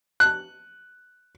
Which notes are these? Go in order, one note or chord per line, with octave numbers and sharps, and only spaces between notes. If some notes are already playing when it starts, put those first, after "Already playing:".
F#6